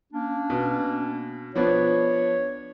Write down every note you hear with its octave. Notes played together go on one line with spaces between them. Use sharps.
A#3 C#4 D4
B2
F3 B3 D4 C#5